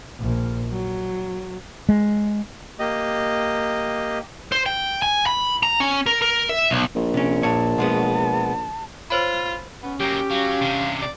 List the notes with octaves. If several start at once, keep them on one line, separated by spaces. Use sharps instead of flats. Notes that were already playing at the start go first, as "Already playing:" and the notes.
A#1
F#3
G#3
A#3 G4 D#5
C5
G5
G#5
B5
A#5
C#4
A#4
A#4
E5
B1
A#1
C3 C#4
A#2 C#5 A5
B2 G#3 B3
F4 C5 C#5 B5
B3 C#4
F#3 A#3 G4 G5
F#3 F5
C3 D4
D5